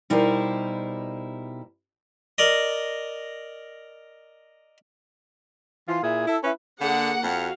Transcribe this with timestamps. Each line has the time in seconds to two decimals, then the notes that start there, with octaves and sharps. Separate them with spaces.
0.10 B2 G3 D#4 E4 A#4 C5
2.38 A#4 D5 D#5
5.89 E3 F4
6.03 A#2 E4 G#4
6.28 E4 A4 E5
6.44 C#4 E4 B4
6.81 D3 A#3 G#4 F#5
7.24 F2 F#4 F5